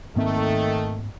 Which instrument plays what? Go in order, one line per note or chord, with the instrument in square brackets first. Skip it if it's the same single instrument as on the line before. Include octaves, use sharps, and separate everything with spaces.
[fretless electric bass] G#2 A#3 C4 [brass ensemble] D#3 A3